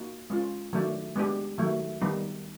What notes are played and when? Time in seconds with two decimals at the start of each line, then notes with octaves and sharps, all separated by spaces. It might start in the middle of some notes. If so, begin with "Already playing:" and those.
Already playing: A#3 D#4 F#4
0.30 G#3 C#4 F4
0.73 D#3 F#3 A3 D4
1.16 G#3 B3 D4 G4
1.58 D#3 F#3 A3
2.01 D#3 G3 B3 D#4